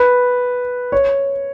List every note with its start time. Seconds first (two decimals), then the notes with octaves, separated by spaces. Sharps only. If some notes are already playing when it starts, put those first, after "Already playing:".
Already playing: B4
0.92 C#5